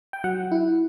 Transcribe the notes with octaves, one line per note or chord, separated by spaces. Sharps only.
G5
F#3 F#5
E4